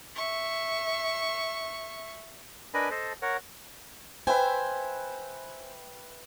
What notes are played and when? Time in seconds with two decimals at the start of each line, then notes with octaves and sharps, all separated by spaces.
0.16 E5 C#6
2.74 D4 A#4 B4 D#5 G#5 B5
2.91 A4 C5 D#5 A5
3.22 A#4 C#5 F#5
4.27 B4 C5 E5 G5 G#5